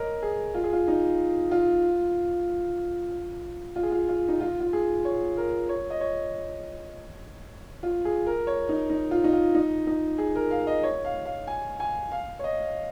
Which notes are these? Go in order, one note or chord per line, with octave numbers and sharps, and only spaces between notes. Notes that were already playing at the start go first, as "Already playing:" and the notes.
Already playing: A#4 C#5 D#5
G#4
F4
G#4
F4
D#4
F4
F4
G#4
F4
F4
D#4
F4
F4
G#4
C#5
A#4
C#5
D#5
C#5
F4
G#4
A#4
C#5
D#4
D#4
F4
D#4
F4
D#4
D#4
G#4
A#4
F5
D#5
C#5
F5
F5
G#5
G#5
F5
C#5
D#5